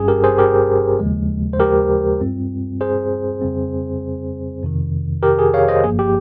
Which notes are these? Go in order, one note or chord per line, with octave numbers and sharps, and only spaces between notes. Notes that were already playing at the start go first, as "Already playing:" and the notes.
Already playing: G1 G2 G3 C#4 G#4
G4 A#4
G#4 C5
G4 A#4
D#2 C#3 F3 G#3
C5
G4 A#4
G2 G3 C4 F4
G#4 C5
F2 C#3 G3 C4
F2 C3 D#3
G4 A#4
G#4
C#5 F5
C5 D#5
G1 G2 F3 A#3 G#4
G4